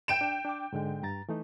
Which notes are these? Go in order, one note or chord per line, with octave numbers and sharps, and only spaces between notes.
G5 D7 E7
D4
D4 D6
G#2 D3 G#3
G2 A#5 A6
E3 A3 D#4